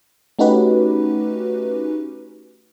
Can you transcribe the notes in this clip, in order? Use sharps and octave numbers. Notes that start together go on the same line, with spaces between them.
A3 C#4 D#4 F#4 G4 B4